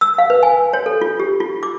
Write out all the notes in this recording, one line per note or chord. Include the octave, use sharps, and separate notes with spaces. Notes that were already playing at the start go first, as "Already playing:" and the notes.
E6
F5
B4
G#5
C#5
A4
F4
G4
F4
D6